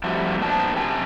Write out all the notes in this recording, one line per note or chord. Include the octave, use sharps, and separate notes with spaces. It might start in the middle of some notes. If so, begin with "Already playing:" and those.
F3 G3 A3 C4 E4 F#4
A#2 B3 D4 A#4 C5 A5
F#2 C3 G5 G#5